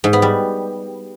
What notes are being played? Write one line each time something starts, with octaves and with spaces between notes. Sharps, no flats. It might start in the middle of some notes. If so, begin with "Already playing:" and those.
G#2
B3
G3